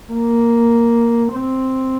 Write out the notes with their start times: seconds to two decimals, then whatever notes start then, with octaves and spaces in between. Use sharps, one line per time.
0.12 A#3
1.34 C4